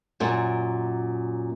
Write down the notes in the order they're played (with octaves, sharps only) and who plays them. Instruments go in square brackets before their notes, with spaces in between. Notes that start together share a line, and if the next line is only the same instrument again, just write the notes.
[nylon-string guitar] F#2 A#2